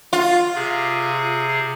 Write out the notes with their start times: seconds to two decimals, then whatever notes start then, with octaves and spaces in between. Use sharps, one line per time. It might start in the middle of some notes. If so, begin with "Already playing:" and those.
0.13 F4
0.55 C3 G#4